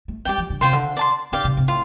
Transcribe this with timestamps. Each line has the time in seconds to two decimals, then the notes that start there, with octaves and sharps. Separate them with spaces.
0.08 A3
0.25 G3 G4 D5 G5
0.38 F3
0.50 D3
0.61 C3 F4 C5 G5 C6
0.73 D3
0.97 D5 A5 C6
1.32 D3 G4 D5 F5
1.44 C3
1.57 C3
1.68 A2 F4